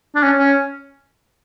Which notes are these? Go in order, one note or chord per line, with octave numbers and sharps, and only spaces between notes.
D4
C#4
C#4